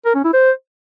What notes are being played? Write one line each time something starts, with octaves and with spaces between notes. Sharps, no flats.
A#4
C#4
E4
C5